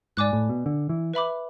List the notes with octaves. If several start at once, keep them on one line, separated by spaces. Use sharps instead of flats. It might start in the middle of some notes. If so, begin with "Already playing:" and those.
G#2 D5 G#5 D6 F#6
A2
B2
D3
E3
B4 E5 B5 D6